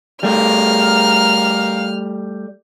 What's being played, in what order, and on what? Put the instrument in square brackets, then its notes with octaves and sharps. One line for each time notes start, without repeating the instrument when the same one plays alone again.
[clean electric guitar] G3 A3 [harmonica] A#4 F5 [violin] F6